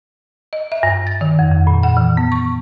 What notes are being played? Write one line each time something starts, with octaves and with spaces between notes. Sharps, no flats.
D#5
E5
G2
A6
D#3
F2
F2
A#2
F#5
E3
B3
C#6